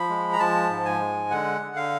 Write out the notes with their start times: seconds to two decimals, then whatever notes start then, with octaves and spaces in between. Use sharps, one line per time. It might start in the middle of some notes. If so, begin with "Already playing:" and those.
Already playing: F3 B5
0.09 G#3
0.33 A#5
0.40 F3 A5
0.70 G#2
0.85 G#5
1.00 G#3
1.31 D3 F#5
1.61 D3
1.76 F5